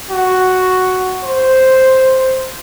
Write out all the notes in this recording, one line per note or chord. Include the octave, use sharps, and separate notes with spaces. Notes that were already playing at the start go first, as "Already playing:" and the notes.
F#4
C5